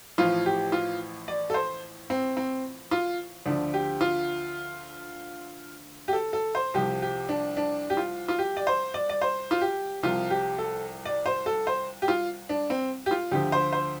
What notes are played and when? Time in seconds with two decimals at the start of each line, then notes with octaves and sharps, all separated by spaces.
0.18 A1 A2 F3 F4
0.46 G4
0.72 F4
1.28 D5
1.50 A4
1.54 C5
2.10 C4
2.37 C4
2.91 F4
3.46 D2 D3 F3 D4
3.74 G4
4.01 F4
6.08 G4
6.13 A4
6.33 A4
6.55 C5
6.74 C2 C3 F3 G4
7.02 G4
7.29 D4
7.57 D4
7.90 G4
7.97 F4
8.28 F4
8.39 G4
8.57 D5
8.67 C5
8.94 D5
9.09 D5
9.22 C5
9.51 F4
9.61 G4
10.03 C2 C3 F3 F4
10.30 G4
10.58 A4
11.05 D5
11.26 C5
11.46 A4
11.67 C5
12.02 G4
12.08 F4
12.49 D4
12.70 C4
13.06 G4
13.11 F4
13.32 D2 D3 F3 G4
13.52 C5
13.72 C5